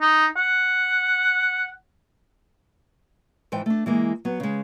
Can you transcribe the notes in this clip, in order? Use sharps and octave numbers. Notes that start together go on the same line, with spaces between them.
D#4
F#5
G#2 E3 C5 G5
A3 D4
E3 G#3 A#3
F#3 B3
C#3 G#3